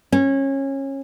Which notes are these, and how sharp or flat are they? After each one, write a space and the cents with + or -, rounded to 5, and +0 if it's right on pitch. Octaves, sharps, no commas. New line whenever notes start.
C#4 -25